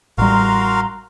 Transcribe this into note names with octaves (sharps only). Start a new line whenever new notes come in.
A1 G3 F#4 A#4 F5 A#5 C6